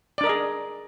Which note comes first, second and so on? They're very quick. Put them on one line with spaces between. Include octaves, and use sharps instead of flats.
D5 D4 A#4 D#5 G#4